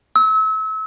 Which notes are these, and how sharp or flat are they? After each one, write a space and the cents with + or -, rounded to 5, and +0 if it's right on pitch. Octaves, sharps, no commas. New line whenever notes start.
E6 -30